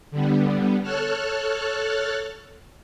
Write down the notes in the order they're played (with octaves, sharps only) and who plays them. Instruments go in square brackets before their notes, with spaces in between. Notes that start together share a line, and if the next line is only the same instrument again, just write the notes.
[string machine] D3 G3 B3
A4 C#5 A5 F6 F#6